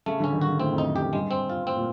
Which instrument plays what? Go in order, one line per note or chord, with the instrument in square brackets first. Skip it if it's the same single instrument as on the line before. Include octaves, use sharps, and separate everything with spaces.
[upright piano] C#3 [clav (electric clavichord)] A3
[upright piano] D3 [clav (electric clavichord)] C#4
[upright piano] D#3
[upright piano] C#3 [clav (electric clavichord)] F#4
[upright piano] A2 [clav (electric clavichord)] C4
[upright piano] F2
[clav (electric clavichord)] D#4
[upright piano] F#2
[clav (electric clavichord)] G4
[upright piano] G2 [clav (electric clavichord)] G#3
[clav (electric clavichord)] C4
F4
[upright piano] A2 [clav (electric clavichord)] C4
[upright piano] A#2